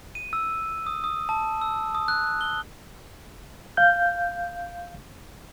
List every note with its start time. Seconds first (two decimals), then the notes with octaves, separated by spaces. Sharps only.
0.15 D#7
0.33 E6
0.87 D#6
1.04 D#6
1.29 A5
1.61 E6
1.95 D#6
2.08 F#6
2.41 G7
3.77 F5 G6